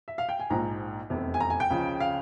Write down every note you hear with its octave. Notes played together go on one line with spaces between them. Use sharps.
E5
F5
G5
G#5
A#1 G#2 F3 A#5
F1 E2 C3
G#5
A#5
G#5
G5
C#2 C#3 F3
F5